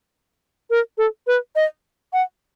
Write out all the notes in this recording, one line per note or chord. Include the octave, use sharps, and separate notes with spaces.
A#4
A4
B4
D#5
F#5